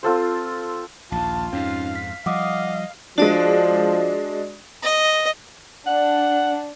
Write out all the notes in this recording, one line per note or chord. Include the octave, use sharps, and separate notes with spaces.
C4 F4 A4 C5
A#1 D#2 F4 A5
F2 G#2 C#4 D#4 F5
B6
F3 G3 D#5 F5 F#5 D6 D#6
F3 G#3 D4 F#4 D5 D#5
D#5
D4 F#5